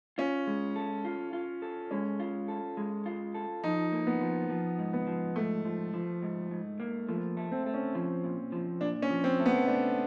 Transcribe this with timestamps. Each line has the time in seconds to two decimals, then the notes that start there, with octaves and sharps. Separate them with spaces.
0.18 C#4 F4
0.47 G#3
0.76 A4
1.05 F4
1.33 F4
1.62 A4
1.91 G#3 C#4
2.20 F4
2.48 A4
2.77 G#3
3.06 F4
3.34 A4
3.64 F3 D#4
3.92 A#3
4.07 B3
4.21 F3
4.49 F3
4.79 G#2
4.93 B3
5.07 F3
5.36 G#2 A3
5.65 F3
5.94 F3
6.22 G#2
6.51 G#2
6.80 A#3
7.08 F3 A3
7.37 A3
7.52 C4
7.66 A3
7.74 C#4
7.95 F3
8.24 A#2
8.52 F3
8.81 A#2 D4
9.02 C#4
9.10 F3
9.24 C4
9.39 A3
9.46 B3
9.67 A3 D4